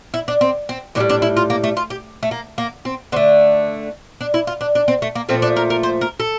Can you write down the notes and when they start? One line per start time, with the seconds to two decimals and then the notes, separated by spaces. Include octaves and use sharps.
0.14 E4
0.28 D4
0.41 C4
0.69 C4
0.95 A2 E3 D4
1.00 G3
1.10 D4
1.22 E4
1.37 F4
1.50 A#3
1.64 A3
1.77 F4
1.90 G4
2.23 A3
2.31 A#3
2.58 A#3
2.85 C4
3.12 D3 C4
3.16 A3
4.21 D4
4.34 E4
4.47 F4
4.61 D4
4.75 D4
4.88 C4
5.02 A3
5.15 A#3
5.29 A#2 F3 A3 C4
5.42 D4
5.57 A#4
5.70 A#4
5.83 C5
6.01 A#4
6.20 A4